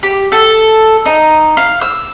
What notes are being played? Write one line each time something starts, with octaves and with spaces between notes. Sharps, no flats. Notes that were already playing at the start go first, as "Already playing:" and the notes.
G4
A4
D#4
F5
E6